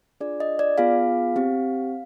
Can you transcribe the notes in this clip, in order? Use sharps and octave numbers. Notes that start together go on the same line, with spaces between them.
D4 F4 G#4 D5
D#5
D5
B3 F4 G#4 F5
C4 G4